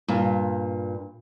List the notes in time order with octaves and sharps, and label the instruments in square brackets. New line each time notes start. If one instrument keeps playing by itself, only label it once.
[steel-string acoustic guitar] G2 A#2